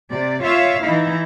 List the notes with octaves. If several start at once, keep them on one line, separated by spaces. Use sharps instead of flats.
C3 D5
F4 C#5 E5 F5
E3 D#4 E4